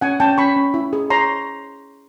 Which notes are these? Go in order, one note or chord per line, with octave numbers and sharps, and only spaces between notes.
C#4 F#5 G#5
C#4 G5 A5
C#4 B5 C#6
C#4
E4
G#4
C#5 A#5 C6